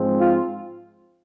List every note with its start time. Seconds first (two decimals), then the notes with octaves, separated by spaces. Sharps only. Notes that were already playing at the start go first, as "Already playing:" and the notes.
Already playing: G#2 F3 G#3 C4
0.21 F4